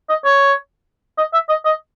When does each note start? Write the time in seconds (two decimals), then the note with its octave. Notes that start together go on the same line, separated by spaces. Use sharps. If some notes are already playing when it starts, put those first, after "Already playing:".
0.09 D#5
0.25 C#5
1.18 D#5
1.33 E5
1.49 D#5
1.64 D#5